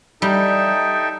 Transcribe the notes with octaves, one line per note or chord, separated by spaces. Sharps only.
G3 D#4 A4 E5 G5